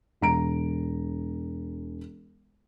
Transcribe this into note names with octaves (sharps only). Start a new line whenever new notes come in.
E1 A#5 D7